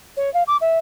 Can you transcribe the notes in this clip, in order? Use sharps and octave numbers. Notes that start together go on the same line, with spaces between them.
C#5
F5
D6
E5